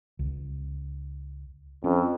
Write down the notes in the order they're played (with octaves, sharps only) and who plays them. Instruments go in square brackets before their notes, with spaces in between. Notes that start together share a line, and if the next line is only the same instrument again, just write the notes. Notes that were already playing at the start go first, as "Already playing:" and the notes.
[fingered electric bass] C#2
[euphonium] F2 [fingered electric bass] C#4